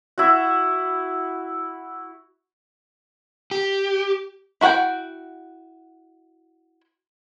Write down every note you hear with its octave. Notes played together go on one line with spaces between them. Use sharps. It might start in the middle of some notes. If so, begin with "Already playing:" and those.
E4 F#4
G4
E4 F#4 A#4 F#5 G5